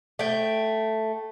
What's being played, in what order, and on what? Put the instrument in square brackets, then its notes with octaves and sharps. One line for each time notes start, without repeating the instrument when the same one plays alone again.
[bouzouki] A3 G5